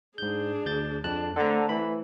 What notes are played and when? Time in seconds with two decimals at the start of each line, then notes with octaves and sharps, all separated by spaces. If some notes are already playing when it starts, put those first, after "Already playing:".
0.18 G#2 D4 G#4 G6
0.66 D2 G6 A6
1.04 F2 D4 A5 F#6
1.36 D3 A3 C4 A4 A#5
1.69 E3 B5